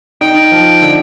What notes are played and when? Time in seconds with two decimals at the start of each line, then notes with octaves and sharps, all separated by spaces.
0.21 D#4 G5
0.52 F3
0.82 D3